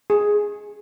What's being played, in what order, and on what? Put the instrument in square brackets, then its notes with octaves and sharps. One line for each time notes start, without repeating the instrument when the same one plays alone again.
[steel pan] G#4